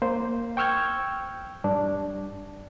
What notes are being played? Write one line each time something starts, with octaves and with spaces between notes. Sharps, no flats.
A#3 C5
G5 C#6 E6 F6 G6 G#6
G2 D4